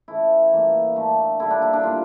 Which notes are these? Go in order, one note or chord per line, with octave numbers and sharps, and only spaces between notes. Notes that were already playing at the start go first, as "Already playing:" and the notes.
C#3 E3 A3 E4
A2 E3 G3 A#3
D3 A3
D3 G3 A#3 E4
D4
E4
D4
A2 G3 A#3 F4